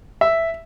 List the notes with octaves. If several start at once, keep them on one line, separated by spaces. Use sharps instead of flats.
E5